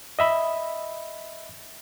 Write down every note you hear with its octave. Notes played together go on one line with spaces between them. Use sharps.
D#5 E5 B5